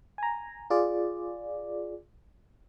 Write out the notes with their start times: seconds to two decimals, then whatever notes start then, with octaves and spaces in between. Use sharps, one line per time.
0.18 G#5 A#5
0.70 F4 G#4 D5